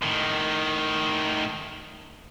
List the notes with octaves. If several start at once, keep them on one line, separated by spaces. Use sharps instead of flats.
A2 D#3